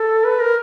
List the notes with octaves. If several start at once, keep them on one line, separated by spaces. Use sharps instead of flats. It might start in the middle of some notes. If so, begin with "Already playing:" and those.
Already playing: A4
B4
A#4